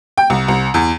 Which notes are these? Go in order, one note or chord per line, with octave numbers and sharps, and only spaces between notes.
G5
C2
C2
E2